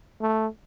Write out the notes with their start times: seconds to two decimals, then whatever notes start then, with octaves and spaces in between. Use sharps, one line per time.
0.22 A3